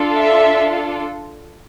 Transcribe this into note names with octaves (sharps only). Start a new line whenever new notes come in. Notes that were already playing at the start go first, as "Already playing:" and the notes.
Already playing: D4 F4 A4
E5